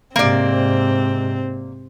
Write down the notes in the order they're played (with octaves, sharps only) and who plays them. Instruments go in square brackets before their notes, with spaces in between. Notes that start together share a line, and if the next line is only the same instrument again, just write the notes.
[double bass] G#2 C3 [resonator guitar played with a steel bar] A#3 D5 [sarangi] C4